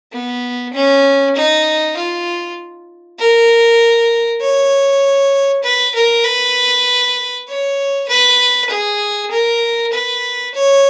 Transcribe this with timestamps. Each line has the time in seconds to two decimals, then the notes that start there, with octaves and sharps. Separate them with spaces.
0.12 B3
0.73 C#4
1.35 D#4
1.96 F4
3.19 A#4
4.41 C#5
5.63 B4
5.94 A#4
6.24 B4
7.48 C#5
8.08 B4
8.69 G#4
9.30 A#4
9.92 B4
10.54 C#5